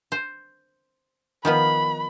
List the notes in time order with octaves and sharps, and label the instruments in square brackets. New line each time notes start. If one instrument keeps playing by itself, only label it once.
[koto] C5
[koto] D#3 F3 B3 [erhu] B5